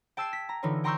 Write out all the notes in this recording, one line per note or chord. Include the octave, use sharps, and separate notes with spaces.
G5 A5 E6 G#6 C7 E7
B6
A#5
D3 E3 D#4 F4 C#5
G5 A#5 C6 C#6 E6 G6